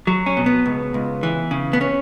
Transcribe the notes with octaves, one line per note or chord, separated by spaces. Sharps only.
F#3
C#4
B2
B3
C#2
C#2
E3
C#3
B3
C#4